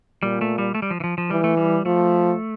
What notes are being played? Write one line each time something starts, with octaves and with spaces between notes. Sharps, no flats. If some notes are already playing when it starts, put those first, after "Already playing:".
A#2 G3
A3
G3
A3
G3
F3
E3
F3
F3
E3 G3
A3
G3
F3 A3